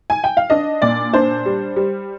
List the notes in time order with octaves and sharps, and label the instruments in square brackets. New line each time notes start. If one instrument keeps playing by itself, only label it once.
[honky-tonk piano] G#5
G5
F5
D4 D#5
A#2 D5
D4 C5
G3
G3